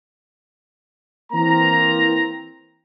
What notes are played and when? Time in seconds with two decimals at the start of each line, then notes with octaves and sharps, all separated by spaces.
1.33 E3 A#3 C4 A#5